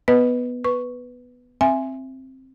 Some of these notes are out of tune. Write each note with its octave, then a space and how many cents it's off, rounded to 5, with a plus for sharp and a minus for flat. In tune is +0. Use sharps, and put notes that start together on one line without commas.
B3 +0 B4 -5 D#5 +0
B4 +0 C#6 +0
C4 +10 E5 +15 G#5 +0